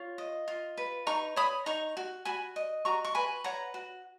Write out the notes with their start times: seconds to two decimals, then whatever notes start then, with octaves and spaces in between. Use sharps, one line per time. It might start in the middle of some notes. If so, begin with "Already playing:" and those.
Already playing: F4 C#5
0.18 D#5
0.48 F4
0.77 B4
1.07 D#4 A#5 C#6
1.36 C#5 B5 D#6
1.66 D#4 A#5 C#6
1.97 F#4
2.25 F#4 G#5 B5
2.56 D#5
2.85 F#4 A#5 C#6
3.05 C#6
3.15 B4 G#5 B5
3.44 C#5 F#5 A#5
3.74 F#4